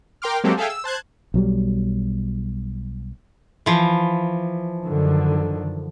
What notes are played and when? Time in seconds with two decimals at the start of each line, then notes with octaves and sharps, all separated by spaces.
0.22 A#4 G5 C6 D6 F6
0.44 F#3 G#3 A#3 C4 G4 A4
0.57 G#4 A4 E5 F5 G5 G#5
0.70 E6
0.84 C5 A5 F#6 G#6
1.34 B1 F#3 G3
3.66 E3 F3
4.83 F#2 D3 D#3